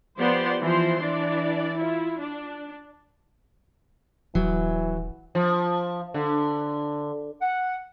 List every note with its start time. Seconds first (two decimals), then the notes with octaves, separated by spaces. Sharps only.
0.18 F3 B3 G4 C5 D5 C6
0.61 E3 F3 C5 C6
1.01 E3 D4 D5
1.77 E4 F4
2.21 D4
4.35 D#1 E3 F#3
5.35 F3
6.14 D3
7.41 F#5